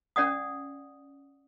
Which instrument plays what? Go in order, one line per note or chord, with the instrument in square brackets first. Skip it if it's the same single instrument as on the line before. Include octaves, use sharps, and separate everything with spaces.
[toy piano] C#4 D5 F#5 D#6